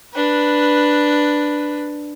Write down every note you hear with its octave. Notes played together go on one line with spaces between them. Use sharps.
D4 B4